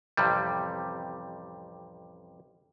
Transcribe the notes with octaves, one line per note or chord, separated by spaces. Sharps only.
A1 F2 C3 G3